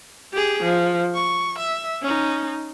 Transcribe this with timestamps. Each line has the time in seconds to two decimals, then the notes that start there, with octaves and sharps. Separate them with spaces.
0.33 G4 G#4
0.63 F3
1.15 C#6
1.58 E5
2.02 C#4 D#4